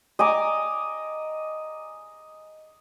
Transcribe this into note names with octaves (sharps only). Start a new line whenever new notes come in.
D#5 G#5 A#5 D6